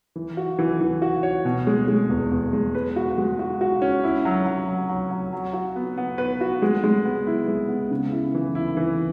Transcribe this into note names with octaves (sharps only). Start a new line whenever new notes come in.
E3
F#4
E3
E3
F#4
C#5
B2
G#3
G#3
E2
E2
G#3
B4
F#4
G#3
F#4
F#4
C#4
E4
F#3
F#3
F#3
F#3
F#3
F#3
F#4
B3
B3
B4
F#4
G#3
G#3
B3
E4
G#3
B3
C#3
E4
E3
E4
E3